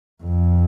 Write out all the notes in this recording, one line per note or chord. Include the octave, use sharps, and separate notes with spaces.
F2